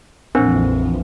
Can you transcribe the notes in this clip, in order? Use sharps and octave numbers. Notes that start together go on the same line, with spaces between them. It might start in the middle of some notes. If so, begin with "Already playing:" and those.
A#1 F2 E3 F3 C4 D4 A#4 C5